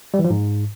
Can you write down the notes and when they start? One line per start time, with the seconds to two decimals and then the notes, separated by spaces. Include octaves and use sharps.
0.14 G3
0.19 E3
0.25 F3
0.30 G#2